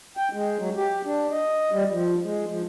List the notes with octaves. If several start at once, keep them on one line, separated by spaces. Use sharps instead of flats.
G5
G#3
F#3
G4
D4
D#5
G3
F3
G#3
F3